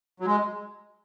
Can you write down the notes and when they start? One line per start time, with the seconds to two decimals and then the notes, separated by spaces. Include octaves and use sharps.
0.20 F#3
0.26 G#3